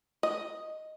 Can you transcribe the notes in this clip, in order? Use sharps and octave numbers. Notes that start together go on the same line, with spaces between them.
D#5